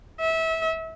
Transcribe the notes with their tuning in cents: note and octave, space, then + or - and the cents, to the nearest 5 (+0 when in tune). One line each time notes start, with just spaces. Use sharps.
E5 -25